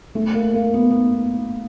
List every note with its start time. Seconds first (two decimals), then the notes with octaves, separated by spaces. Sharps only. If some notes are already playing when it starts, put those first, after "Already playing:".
0.15 A3
0.34 A#3
0.54 A#3
0.74 B3
0.90 B3